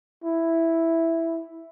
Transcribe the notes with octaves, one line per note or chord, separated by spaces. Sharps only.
E4